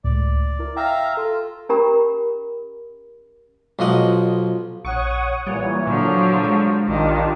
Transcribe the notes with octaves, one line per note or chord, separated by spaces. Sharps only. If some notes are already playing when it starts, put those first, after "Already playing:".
C#2 A2 D5
E4 A#4
E5 F5 G5 A#5 F6 A#6
F4 A4
C#4 G4 A#4 A#5 B5
B1 F3 D#5 F#5
A#1 C#5 F#5 C#6 D#6
A#2 E3 G3 C#5
A#2 D3 F3 F#3
G#3
A#1 D#3 D4 F4 G4